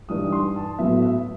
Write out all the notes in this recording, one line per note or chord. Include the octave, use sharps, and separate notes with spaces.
G2 E3 G3 D#4 D#6
C6
A5
A2 F#3 B3 E5
E5